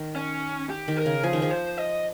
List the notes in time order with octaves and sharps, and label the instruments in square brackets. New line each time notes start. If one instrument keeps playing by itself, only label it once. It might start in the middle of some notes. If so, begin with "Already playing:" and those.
Already playing: [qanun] D#3
[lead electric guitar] C#4
G4
[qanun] D#3
[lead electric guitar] A#4
[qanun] C#3
[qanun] F3 [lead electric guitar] G#4
[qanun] D#3
F3
[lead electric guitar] C5
D#5